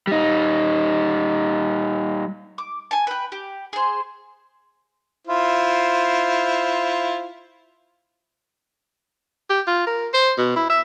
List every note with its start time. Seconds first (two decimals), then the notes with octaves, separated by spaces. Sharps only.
0.07 G3 D#4
2.58 D6
2.91 G#5 A5
3.07 B4 G5
3.32 G4
3.73 G#4 C5
5.27 E4 F4 C5
9.50 G4
9.67 F4
9.87 A#4
10.14 C5
10.38 B2
10.56 E4
10.70 E5